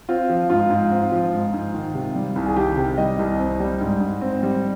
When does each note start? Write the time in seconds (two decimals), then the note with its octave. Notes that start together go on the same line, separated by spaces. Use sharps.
0.09 C4 F4
0.29 F3
0.50 G#2 F4
0.70 G#2
0.91 C4
1.12 F3
1.33 G#2
1.54 G#2
1.74 D#3
1.94 C3
2.16 G3
2.36 C2
2.46 G#4
2.56 D#3 G4
2.77 C3
2.98 G3 D#5
3.19 C2
3.39 C4
3.60 G3
3.81 G#2
4.01 G#2
4.21 C4
4.43 G3